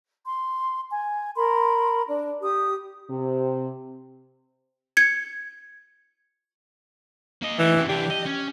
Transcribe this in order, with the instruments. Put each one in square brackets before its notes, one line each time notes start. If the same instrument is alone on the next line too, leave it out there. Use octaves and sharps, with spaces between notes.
[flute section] C6
G#5
A#4 B5 C6
D4
G4 D#6
[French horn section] C3
[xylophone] G#6 C#7
[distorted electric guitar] A#3 D#5
[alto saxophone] E3 [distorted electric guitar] A3 D#4
[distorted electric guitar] F#2 C3
[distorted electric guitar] E3 D4 [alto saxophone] G4
[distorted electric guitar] D#5
C#4